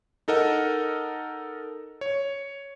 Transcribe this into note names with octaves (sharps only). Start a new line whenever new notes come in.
D#4 A4 A#4 D#5 F#5
C#5